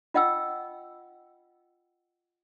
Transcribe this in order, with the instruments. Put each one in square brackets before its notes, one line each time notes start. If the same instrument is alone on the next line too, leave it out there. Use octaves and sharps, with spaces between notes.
[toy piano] F4 D#5 F#5 G5 E6